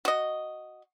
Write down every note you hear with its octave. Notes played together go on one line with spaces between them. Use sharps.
F#4 D#5